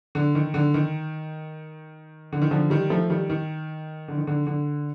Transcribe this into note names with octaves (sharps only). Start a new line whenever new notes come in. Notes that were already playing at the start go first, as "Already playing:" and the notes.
D3
D#3
D3
D#3
D3
D#3
D3 F3
D#3 G3
F3 A3
D#3 G3
D#3
D3
D#3
D3
D3